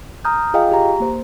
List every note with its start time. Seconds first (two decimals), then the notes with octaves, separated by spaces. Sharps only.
0.25 A#5 D#6 F6 G6
0.54 F4 G#4 D#5 F5 G5
0.72 G4 A#5
1.00 A#3 C5